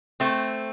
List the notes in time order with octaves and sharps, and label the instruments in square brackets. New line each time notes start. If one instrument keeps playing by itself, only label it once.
[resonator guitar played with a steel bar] A3 C4